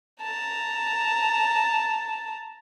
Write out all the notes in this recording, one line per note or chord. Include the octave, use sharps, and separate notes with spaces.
A5 A#5